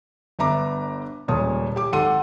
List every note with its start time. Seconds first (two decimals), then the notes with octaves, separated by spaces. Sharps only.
0.39 G1 B3 D4 E5 A#5 D6
1.28 D#1 C#2 A#2 C#5 A5 D#6
1.76 G4 D6
1.92 G#1 A4 F#5 C6 D#7